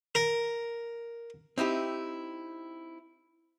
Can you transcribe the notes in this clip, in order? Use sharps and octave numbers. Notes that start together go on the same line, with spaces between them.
A#4
C4 D#4 E4 G4